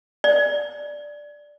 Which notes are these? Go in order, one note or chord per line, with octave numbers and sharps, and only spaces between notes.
D5